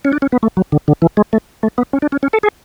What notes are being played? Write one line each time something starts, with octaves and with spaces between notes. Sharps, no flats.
C#4
D4
C#4
B3
A3
F#3
D3
D3
E3
G#3
A3
A3
B3
C#4
D4
C#4
C#4
A4
G#4